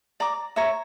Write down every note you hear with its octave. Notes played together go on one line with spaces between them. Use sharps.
D5 A#5 D6
C#5 E5 A#5